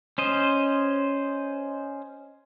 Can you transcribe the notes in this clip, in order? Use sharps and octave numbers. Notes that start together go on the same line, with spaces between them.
C#4 C5 D#5